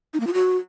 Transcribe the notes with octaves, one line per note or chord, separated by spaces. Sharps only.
D#4
A#3
F4
F#4